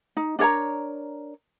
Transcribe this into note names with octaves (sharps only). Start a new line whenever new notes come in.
D#4
D4 A#4 C#5 A#5